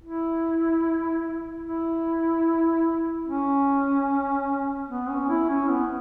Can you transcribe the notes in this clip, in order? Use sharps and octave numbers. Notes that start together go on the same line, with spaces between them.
E4
E4
C#4
B3
C#4
E4
C#4
B3